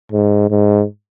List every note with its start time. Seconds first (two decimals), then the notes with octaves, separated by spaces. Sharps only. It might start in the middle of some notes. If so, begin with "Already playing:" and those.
0.12 G#2
0.50 G#2